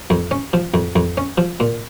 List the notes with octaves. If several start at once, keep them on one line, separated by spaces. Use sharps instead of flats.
F2
C#4
F3
F2
F2
C#4
F3
A#2